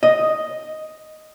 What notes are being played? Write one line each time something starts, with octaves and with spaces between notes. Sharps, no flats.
D#5